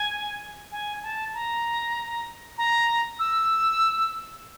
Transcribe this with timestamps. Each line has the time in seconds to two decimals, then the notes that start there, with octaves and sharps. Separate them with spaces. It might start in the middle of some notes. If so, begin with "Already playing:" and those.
Already playing: G#5
0.72 G#5
1.03 A5
1.34 A#5
2.58 A#5
3.19 E6